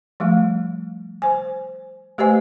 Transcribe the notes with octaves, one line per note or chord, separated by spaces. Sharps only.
F3 G3 A3
C5 G#5
A3 G4 B4 C5 D#5 G#5